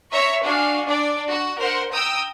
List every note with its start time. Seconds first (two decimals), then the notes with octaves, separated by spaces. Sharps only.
0.11 C#5 E5 A#5 C#6
0.42 D4 F#4 F5 G#5
0.86 D4 D5
1.29 F#4
1.59 A#4 C5 F#5
1.92 G5 A#5 D#6 E6